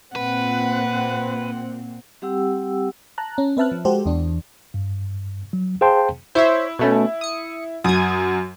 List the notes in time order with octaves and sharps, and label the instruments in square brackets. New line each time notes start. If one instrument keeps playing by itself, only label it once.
[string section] A#2 C4 [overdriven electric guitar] B4 [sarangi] F#5
[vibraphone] G3 C4 G4 F#5 G5 E6
[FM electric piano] A5 A#5 F#6
C#4
C4 B4 E5 A5 F6 F#6
F3
G#3 F#4 G4 A4 C5
E2 E3 D4
[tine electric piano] G2
F#3
G#4 C5 F5 G5 A5 C6
[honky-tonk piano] E4 [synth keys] C5 C#5 E5
[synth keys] B2 A3 C#4
D#6 C#7
[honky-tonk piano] F#2 [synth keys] D#6 G#6